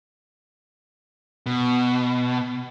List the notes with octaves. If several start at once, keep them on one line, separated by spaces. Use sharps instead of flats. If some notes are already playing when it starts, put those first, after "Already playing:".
B2